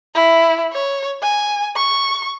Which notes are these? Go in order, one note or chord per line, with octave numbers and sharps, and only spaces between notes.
E4
C#5
G#5
C#6